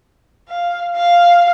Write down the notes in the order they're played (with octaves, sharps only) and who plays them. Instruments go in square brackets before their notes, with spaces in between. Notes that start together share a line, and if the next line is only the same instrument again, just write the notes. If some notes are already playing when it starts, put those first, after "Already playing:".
[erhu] F5
F5